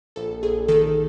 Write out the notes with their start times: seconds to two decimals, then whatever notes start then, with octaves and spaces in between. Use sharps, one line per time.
0.16 A#1 A4
0.43 A#1 G#4
0.68 D#3 A4